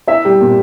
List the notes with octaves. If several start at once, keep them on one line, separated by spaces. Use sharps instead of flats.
E4 E5
G3
A#2